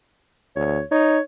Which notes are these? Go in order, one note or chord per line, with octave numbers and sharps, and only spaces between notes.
D2 C#5
D#4 C#5